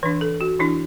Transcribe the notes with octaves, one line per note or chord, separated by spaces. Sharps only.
E3 D4 B4
A4
F#4
E3 D4 E4